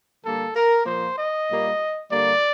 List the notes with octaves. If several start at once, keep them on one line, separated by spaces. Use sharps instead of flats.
D3 G3 A#3 A4
A#4
A#2 F3 A#3 C5
D#5
A#2 G3 A#3
D3 G3 A#3 D5